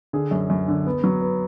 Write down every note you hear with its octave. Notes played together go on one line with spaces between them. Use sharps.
D3 G#4
F#2
F#2
D3
B3
F#3
B3